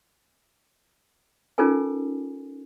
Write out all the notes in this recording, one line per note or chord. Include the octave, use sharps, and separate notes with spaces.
C#4 D#4 F4 A4 A#4 G#5